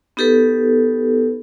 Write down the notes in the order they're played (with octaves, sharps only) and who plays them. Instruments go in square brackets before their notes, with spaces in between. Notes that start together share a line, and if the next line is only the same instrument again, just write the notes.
[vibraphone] B3 D#4 G4 A4 B4